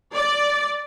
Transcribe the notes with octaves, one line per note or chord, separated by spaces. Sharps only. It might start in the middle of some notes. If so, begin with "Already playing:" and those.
D5